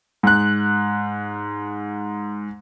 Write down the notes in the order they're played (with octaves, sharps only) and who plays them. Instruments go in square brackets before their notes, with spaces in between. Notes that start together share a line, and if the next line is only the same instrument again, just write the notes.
[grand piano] G#2 F#6